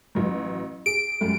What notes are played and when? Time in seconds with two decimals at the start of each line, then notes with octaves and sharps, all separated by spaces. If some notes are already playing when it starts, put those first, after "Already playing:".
0.15 A1 D#3 F#3
0.86 G#4 D7
1.21 F#2 G3 A3